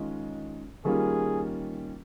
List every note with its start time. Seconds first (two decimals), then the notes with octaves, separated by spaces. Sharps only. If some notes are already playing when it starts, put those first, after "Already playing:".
Already playing: D#3 G#3 C#4 F4
0.85 D#3 G3 A#3 C#4 F4 G#4